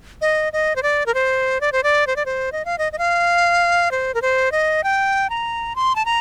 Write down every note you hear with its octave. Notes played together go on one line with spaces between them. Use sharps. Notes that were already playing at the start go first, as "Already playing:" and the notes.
D#5
D#5
C5
D5
A#4
C5
D5
C5
D5
C5
D5
C5
D#5
F5
D#5
D#5
F5
C5
A#4
C5
D#5
G5
A#5
C6
A5
A#5